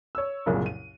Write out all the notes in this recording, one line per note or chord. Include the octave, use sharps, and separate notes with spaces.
C#5 E6
C2 F#2 A#2 C#3
D#7